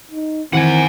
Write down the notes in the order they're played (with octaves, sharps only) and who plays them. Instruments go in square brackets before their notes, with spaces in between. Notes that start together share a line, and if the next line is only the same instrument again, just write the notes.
[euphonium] D#4
[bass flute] D#3 [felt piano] E3 [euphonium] C4 [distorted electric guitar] F#5 G#5